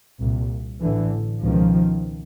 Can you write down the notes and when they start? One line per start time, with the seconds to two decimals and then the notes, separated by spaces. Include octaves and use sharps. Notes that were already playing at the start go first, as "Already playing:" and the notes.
0.20 C2 A#2
0.81 A1 A2 D3 E3
1.42 C#2 B2 D#3 F3